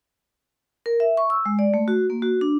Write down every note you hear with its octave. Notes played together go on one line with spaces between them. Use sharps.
A#4
E5
C#6
E6
G#3
D5
A3
F#4
A#3
F#4
D4